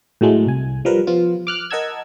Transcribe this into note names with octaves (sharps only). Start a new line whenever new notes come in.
A2 F#3 G#3 A3
C2 G#5
F3 G3 A#4 B4
F3 B3 F4
D6 F6 F#6
A#4 D#5 F#5 A5 E6 G#6